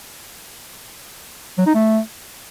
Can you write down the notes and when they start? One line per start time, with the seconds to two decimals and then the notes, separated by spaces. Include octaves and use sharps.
1.58 F#3
1.67 D#4
1.75 A3